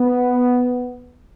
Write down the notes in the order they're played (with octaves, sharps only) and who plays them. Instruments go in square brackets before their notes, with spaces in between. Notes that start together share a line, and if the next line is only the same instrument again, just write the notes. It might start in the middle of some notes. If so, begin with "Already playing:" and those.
Already playing: [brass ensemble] B3